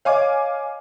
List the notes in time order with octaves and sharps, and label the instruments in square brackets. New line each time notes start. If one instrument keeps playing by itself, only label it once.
[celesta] C#5 D#5 [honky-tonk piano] F5 G#5 D6